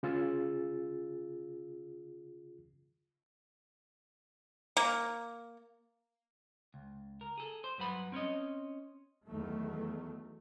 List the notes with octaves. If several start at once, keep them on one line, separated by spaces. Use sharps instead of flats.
C#3 F4 G#4 E6 A6
A#3
C#2
A#4
G#4 A4
C5
G2 F#3 B4 F#5 B5
C4 C#4 C#5 D#5
E2 D#3 F#3 A3